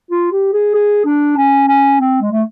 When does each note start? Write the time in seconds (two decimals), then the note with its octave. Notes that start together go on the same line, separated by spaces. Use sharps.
0.11 F4
0.32 G4
0.53 G#4
0.74 G#4
1.05 D4
1.37 C#4
1.68 C#4
2.00 C4
2.21 G#3
2.32 A3